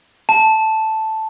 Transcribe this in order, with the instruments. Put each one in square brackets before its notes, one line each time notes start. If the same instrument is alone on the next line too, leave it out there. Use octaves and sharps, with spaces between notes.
[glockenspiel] A5